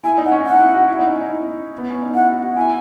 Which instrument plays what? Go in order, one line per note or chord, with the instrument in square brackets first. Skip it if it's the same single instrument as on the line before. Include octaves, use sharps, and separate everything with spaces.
[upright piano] E4 [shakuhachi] G#5
[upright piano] D#4
[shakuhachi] F#5
[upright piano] C#4
[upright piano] D#4 [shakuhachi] F#5
[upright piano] E4
F#4
E4
D#4
C#4
D#4
E4
B3
C#4
D#4
[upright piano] E4 [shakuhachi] F#5
[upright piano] F#4
F#4
[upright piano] E4 [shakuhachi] G#5